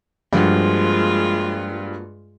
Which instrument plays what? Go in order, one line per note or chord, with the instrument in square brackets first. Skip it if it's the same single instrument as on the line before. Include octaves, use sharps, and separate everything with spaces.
[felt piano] G2 [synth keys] F3 A#3 F#4 [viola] G#3 F4